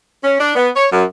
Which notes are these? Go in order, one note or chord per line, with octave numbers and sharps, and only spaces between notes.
C#4
D4
B3
C#5
F#2